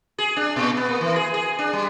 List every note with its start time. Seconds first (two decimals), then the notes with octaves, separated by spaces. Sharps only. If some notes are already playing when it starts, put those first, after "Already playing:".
0.18 G#4
0.36 D4
0.56 A#2
0.77 B3
0.89 A#3
1.01 E3
1.16 G#4
1.34 G#4
1.59 D4
1.73 G3